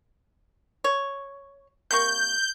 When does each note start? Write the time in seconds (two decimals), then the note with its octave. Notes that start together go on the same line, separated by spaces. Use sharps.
0.84 C#5
1.91 C3 A#3 C#6 G6